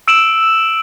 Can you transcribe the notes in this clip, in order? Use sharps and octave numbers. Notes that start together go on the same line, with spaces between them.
E6 D7 E7 F#7